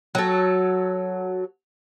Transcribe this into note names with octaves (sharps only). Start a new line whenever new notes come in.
F#3 A4